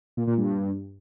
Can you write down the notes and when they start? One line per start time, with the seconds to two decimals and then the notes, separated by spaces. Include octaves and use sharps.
0.17 A#2
0.27 A#2
0.38 G2